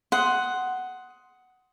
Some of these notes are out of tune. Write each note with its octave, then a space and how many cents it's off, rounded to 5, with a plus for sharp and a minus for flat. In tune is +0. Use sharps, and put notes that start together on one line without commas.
F#5 +5 C6 +0 D#6 +15